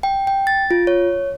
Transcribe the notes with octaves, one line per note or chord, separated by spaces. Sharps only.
G5
G5
A6
F4
C#5